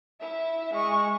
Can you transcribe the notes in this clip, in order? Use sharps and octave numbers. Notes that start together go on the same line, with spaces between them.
E4 E5
G#3 C#6